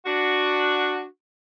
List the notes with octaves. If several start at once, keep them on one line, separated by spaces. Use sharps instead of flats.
D4 F#4